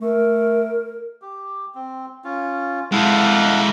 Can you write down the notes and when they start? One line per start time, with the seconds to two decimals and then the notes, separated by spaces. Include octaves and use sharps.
0.01 A3 A#4
1.22 G4
1.74 C4
2.24 C#4 F4
2.92 G#3 E4 A4 F5 F#5